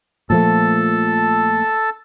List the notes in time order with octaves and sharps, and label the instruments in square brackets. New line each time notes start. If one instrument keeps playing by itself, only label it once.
[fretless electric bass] A#2 F3 A3 [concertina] A4 A5 E6